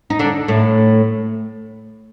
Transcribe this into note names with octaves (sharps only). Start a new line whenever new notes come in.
D#4
D3 D4
A2 A3